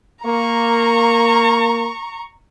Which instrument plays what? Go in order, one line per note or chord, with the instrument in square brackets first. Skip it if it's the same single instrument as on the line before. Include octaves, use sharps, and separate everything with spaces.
[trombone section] A#3 [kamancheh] A#5 C#6